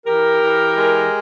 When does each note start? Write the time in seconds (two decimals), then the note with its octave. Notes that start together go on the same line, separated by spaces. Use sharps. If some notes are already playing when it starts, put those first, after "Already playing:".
0.05 E3 G4 A#4
0.40 E3
0.76 G#3